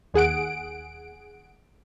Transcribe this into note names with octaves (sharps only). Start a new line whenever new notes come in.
D#2 G#4 F#5 D7